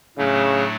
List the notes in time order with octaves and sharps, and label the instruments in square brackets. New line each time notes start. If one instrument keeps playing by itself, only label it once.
[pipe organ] A2 F#3 A3 D4 [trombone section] C#3